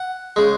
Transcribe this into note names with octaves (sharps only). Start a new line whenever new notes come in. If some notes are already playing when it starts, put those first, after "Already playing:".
Already playing: F#5
C#3 G#3